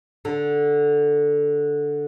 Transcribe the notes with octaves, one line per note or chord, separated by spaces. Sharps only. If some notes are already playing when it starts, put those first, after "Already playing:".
D3